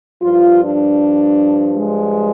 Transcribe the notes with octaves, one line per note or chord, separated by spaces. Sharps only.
G2 F3 F4
D4
G#3